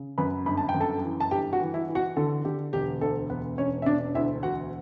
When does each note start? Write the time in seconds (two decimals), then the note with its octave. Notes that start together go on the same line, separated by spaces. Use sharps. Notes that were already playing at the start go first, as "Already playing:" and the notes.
Already playing: C#3
0.18 F#2 B4 B5
0.46 G1 B5
0.57 A5
0.69 G5
0.74 F#2
0.80 A4 A5
1.03 E3
1.20 A5
1.31 G1 G4 G5
1.53 F#4 F#5
1.60 E3
1.74 E4 E5
1.88 E3
1.95 F#4 F#5
2.17 D3 A4
2.45 D3 G4
2.73 E1 G4
3.01 D2 A4
3.30 E1 B3 B4
3.58 E1 C#4 C#5
3.82 E5
3.86 E1 D4 D5
4.14 D2 E4 E5
4.43 E1 F#4 F#5